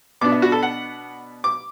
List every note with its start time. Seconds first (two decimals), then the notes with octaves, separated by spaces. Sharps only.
0.21 B2 B3 D4 D6
0.32 E5
0.42 F#4
0.52 A4
0.63 F#5
1.44 D6